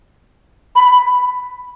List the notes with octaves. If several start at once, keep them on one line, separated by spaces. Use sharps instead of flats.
B5